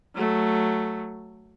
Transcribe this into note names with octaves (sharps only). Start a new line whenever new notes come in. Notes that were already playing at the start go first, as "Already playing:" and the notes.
F#3 A3